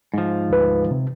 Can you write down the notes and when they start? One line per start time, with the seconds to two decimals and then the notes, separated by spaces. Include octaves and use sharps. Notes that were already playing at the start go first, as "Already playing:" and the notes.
0.14 G#2 F3
0.50 D2 B4
0.91 C3